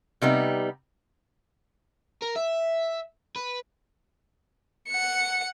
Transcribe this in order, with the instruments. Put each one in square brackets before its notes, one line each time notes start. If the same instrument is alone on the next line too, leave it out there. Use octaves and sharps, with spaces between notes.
[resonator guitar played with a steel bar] C3 G3 B3 D#4
[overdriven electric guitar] A#4
E5
B4
[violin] F#5 C#7